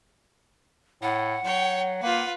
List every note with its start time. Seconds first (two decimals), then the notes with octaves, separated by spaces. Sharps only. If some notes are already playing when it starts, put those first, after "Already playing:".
1.02 A2 F#5
1.44 F#3 C#5 G5
2.02 A#3 F4 B4